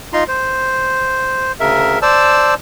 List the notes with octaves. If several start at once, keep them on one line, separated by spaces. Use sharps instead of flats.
D#4 F4 A#5 C6
C5
D2 C#3 A#4 E5
C5 D5 A5 E6